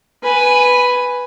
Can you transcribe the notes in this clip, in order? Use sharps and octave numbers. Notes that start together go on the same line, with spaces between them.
B4 G#5